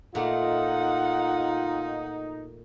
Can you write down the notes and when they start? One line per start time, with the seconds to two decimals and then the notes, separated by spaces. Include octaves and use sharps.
0.15 A#2 A3 D#4 F4 F#5